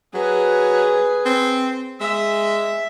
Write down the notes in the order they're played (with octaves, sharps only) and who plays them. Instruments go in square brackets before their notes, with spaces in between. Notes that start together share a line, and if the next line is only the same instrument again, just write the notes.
[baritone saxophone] F#3 [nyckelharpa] G#4 B4
[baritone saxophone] C4
[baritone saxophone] G#3 [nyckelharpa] E5